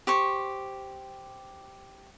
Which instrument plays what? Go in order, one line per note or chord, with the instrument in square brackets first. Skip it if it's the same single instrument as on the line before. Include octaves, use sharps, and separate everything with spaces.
[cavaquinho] G4 C5 C#6